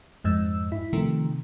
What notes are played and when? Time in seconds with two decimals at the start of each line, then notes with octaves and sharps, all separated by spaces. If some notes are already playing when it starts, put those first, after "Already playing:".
0.24 F2 G#2 E6
0.72 E4
0.93 C3 D#3 F3 A3